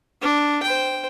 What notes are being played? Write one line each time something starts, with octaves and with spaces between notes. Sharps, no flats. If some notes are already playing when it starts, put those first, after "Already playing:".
D4
C5 G5